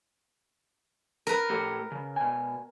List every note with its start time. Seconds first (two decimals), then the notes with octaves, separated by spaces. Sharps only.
1.27 A#4 B4
1.50 A2 G4 A4
1.92 C#3
2.16 B2 G#5